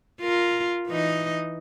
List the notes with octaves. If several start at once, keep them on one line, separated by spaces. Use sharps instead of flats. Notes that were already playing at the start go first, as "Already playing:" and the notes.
F4 A#4
E3 D#4 D#5